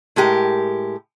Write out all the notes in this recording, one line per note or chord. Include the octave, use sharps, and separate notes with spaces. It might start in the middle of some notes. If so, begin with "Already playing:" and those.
A2 G#3 G4 A#4